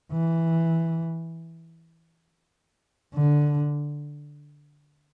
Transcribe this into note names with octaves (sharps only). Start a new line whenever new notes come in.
E3
D3